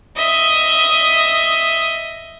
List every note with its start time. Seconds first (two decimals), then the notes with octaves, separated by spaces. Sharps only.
0.16 D#5 E5